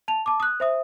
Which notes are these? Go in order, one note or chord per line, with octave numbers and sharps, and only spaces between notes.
A5 F7
A5 D6
D#6 F#6
C5 E5 D#6